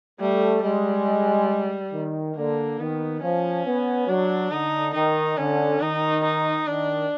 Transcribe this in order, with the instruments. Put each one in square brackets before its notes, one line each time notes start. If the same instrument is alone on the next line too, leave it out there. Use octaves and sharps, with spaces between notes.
[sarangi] G3 [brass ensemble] A3
[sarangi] G3 [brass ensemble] G#3
[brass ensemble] D#3
[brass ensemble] D3 [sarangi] A#3
[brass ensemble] D#3 [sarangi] B3
[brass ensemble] F3 [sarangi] C#4
[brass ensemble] B3
[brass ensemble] F#3 [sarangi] D4
[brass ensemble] D3 [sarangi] D#4
[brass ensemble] D#3 [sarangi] D#4
[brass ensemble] D3 [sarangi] C#4
[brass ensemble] D#3 [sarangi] D#4
[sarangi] D#4
[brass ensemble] D#3 [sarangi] D4